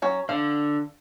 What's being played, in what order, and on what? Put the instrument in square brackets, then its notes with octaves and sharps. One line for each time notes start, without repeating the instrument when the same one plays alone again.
[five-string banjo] F#3 C#4
[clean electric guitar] D3 [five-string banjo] F5